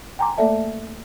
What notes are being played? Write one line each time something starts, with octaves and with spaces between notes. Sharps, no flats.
G5 G#5 A#5 C6 D6
A3 A#3 A4 D5 E5 A5